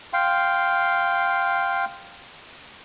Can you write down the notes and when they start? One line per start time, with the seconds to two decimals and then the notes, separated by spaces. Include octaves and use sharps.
0.13 F5 G5 C6